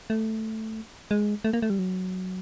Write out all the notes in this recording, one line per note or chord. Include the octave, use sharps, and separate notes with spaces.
A3
G#3
A3
A#3
A3
G3
F#3